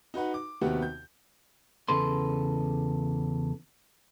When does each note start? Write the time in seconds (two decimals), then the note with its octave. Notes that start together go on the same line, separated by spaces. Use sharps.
0.14 D#4 F#4 B4 F#5
0.34 D6
0.62 D#2 C3 B3 F#4 G4 F#5
0.82 G6
1.88 E2 C#3 A4 B4 C6